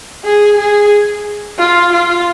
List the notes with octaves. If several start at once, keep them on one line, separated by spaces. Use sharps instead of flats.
G#4
G#4
F4
F4